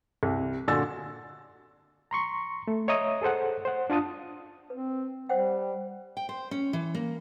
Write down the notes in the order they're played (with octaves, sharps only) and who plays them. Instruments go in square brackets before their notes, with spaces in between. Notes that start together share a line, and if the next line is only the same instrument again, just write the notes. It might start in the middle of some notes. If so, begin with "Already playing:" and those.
[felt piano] C2
A#2 D3 F#4 G#5 E6 A6
[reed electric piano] A#5 C6 C#6
A3
C#5 D#5 E5 A#5 D#6
G#4 A4 C5 F#5
C5 F#5
D4 F4 A5 D#6
[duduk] C4 [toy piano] B4
[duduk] G3 [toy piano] C5 F#5 G5
[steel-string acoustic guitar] G5
C5
C#4
E3
A#3